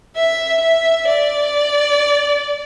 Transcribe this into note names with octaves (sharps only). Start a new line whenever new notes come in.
E5
E5
D5